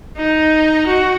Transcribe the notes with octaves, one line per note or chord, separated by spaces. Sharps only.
D#4
F#4